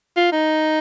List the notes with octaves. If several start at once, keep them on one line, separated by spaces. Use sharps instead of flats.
F4
D#4